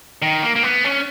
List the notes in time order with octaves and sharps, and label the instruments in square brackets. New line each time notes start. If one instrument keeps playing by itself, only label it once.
[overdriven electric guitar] D#3
A#3
A#3
B3
C#4